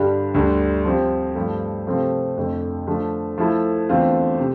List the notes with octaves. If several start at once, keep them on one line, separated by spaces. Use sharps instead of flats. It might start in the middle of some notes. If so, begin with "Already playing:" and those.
Already playing: G2 D3 G3 D4 G4
D2 D3 G3 D4 A4
F3 C4 G4
G2 F3 A3
C3 F3 A3 C4
F2 D3 A3
D3 F3 A3
F3 A3 E4 A4
E2 D3 A3 C4 F4
C3